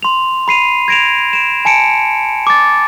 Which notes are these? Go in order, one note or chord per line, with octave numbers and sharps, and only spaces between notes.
C6 F7
B5 C7 D#7 F7
G#6 A#6 D7 E7 F7
D7 E7
G#5 A5 C#7 D7 E7
D6 A6